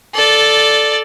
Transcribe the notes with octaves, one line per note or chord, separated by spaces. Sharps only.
A4 D5